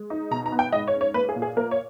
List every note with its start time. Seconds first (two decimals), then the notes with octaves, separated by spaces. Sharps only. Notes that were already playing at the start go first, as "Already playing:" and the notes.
Already playing: G#3
0.10 D#4
0.31 B2 A#5
0.46 A#5
0.52 B3
0.59 G5
0.72 G#2 D#5
0.87 C#5
0.94 C#4
1.01 C#5
1.14 A#3 B4
1.29 G#4
1.36 A#2
1.42 G#4
1.56 A#3 A#4
1.71 C#5